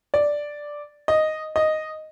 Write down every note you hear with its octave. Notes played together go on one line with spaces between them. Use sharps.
D5
D#5
D#5